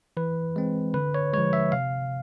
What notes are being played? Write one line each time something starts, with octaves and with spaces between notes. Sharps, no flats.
E3 B4
G#3 C4
D3 B4
C#5
F3 G#3 C#5
E5
C3 F5